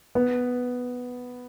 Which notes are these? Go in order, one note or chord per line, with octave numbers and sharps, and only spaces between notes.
B3